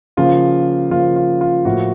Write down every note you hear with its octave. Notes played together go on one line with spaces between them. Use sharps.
C#3 F3 A#3 F4
C#3 F3 A#3 F4
F4
F4
A2 F3 A#3 F#4